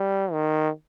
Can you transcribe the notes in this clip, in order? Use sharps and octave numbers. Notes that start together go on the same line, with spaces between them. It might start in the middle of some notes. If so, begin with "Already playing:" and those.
Already playing: G3
D#3